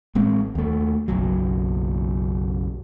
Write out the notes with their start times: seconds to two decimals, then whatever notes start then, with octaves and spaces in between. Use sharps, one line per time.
0.15 A1 G#3 C4
0.55 D#2 A3
1.08 F#1 B1 F#3